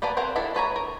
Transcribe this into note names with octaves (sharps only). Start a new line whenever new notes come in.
A#3 B3 B4 D5 A5
C4 G#4 A#4 F5 F#5
E3 D4 E4 A4
A4 B4 C#5 A#5
A#4